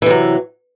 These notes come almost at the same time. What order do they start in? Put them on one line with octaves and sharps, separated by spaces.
E3 C3 F#3